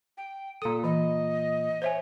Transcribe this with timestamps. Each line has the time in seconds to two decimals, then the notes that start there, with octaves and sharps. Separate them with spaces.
0.17 G5
0.62 A#2 A4 D#6
0.84 E3 D#5
1.82 C5 C#5 E5 G#5